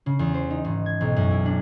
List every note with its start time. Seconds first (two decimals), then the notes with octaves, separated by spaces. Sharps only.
0.06 C#3
0.19 E2
0.34 C5
0.50 D#4
0.64 G#1
0.86 G#6
1.01 B1
1.16 F#2
1.31 E4
1.45 D4